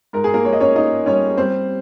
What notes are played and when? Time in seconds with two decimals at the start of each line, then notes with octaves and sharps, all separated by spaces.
0.13 G#2 A#4
0.24 G#4
0.34 A#3 A#4
0.45 G#2 C#5
0.53 D#5
0.60 C#4 C#5
0.76 A#3 D#4 D#5
1.06 G3 C#4 C#5
1.37 G3 C4 C5